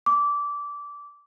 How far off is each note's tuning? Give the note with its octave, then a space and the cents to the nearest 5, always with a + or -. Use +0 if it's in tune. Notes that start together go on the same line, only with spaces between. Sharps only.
D6 -20